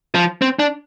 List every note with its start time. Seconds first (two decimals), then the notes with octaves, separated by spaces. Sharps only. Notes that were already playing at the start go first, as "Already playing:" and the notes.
0.15 F3
0.42 C4
0.59 D4